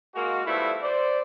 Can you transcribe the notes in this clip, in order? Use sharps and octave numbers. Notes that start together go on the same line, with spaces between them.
G#3 A#3 F#4
D3 F3 G3 A3 B3 E4
C5 D5